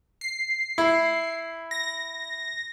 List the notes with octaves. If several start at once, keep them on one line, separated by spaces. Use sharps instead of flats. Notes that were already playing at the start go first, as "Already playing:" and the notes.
C7
E4
A#6